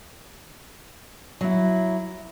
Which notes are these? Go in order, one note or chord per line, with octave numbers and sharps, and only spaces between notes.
F#3 E4